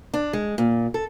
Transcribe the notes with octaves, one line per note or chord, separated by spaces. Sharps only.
D4
G#3
A#2
A4